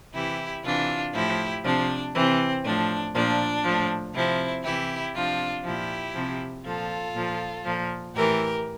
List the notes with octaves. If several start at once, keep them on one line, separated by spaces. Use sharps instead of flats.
C3 E3 E4 G4
C3 E3 D4 F4
A2 F3 E4 G4
C3 F3 D4
C3 E3 C4
A2 F3 D4
A#2 F3 D4
A2 F3
C3 F3 C4 E4
C3 E3 E4 G4
C3 F3 D4 F4
A#2 F3 E4 G4
C3 F3
A#2 F3 F4 A4
A#2 F3
A#2 F3
A2 E3 G4 A#4